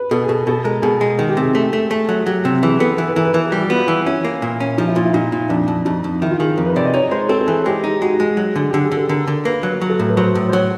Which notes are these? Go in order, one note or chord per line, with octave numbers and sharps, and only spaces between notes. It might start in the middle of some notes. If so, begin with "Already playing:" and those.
Already playing: B4
B2 A4
G#4
B2 A4
B2 A4
G#3 A#4
B2 G#4
G#3
D#3 G#4
G4
C3 G#4
A3
A3
A3
F#3
G#4
F#3 G4
C3
E3 G#4
B3 A4
E3 A4
B4
E3 A#4
B4
E3 A#4
G#4
G3 G4
F#4
B3 F4
E3
C#4 E4
A#3
A#2
C#4
F3 D#4
E4
A#2 F4
E4
A#2 D#4
A#2
F2 D4
F2
F2 D#4
F2
D#3 E4
F4
D#3 G#4
F2 A#4
B4
C3 D5
D#5
D#4 C#5
G#3 C5
C4 A4
A4
E3 G#4
G#3 G4
D#4
G#3 F#4
G#3
F#3
D3 G#4
D3 G4
G#4
D3
A4
D3 A#4
D3
A#3 B4
F#3
F#3
A4
A2 A#4
B4
F#3 C5
A2
C5
F#3 C#5